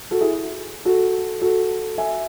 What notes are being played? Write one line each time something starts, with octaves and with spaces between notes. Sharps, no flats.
F#4 A4
E4 G#4
F#4 A4
F#4 A4
E5 G#5